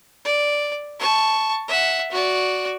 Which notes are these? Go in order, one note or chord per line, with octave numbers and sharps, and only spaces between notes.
D5
A5 C#6
E5 F#5
F#4 D5